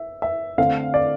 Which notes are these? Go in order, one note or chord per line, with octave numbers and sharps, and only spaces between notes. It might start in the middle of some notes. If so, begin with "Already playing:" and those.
Already playing: E5
E5
D3 A3 C4 F5
D5